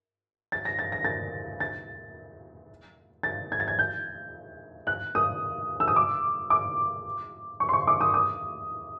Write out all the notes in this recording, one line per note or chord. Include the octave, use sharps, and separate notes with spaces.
A6
A#6
A6
A#6
A6
A6
A6
G#6
A6
G#6
G6
F#6
D#6
E6
D#6
D6
D6
C#6
C6
C#6
D6
D#6
D#6